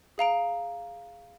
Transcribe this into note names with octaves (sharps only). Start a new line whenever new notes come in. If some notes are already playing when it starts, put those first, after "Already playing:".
G#4 F5 A#5 D7